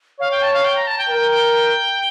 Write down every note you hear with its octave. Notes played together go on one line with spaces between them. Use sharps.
C#5 F5
G5
A5
F5
G5
A#5
A5
G5
A#4 G5
G5